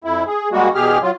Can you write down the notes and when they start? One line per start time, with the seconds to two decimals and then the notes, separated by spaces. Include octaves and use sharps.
0.04 F2 E4
0.27 G#4
0.52 G3 G#3 A#3 F#4
0.75 E2 B2 G4 G#4 F6
1.02 F#3 F4